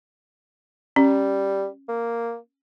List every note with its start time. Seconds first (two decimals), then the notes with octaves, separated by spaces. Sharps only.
0.96 G3 C#4
1.88 A#3